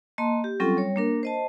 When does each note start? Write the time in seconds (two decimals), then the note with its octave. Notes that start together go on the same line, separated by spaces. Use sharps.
0.18 A#3 D#5 A5 C6
0.44 G4
0.60 F#3 G3 C4 C#4 F4 A4
0.77 G3 C#5
0.96 A#3 D4 A#4
1.23 C5 D#5 A5